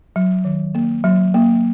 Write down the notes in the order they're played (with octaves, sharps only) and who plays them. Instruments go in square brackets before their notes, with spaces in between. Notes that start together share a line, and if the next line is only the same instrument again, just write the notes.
[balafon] F#3
D#3
A#3
F#3
A#3